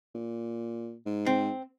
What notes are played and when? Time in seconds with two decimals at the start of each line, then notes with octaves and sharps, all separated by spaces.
0.15 A#2
1.06 G#2
1.26 C4